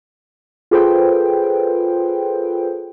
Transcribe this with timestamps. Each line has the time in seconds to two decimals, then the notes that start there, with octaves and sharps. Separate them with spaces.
0.71 F4 G#4 A4 B4 C5 G5